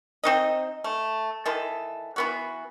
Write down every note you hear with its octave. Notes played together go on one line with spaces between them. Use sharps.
C4 D#4 D#5
A3
D#3 E3 A4
E3 B3 F#4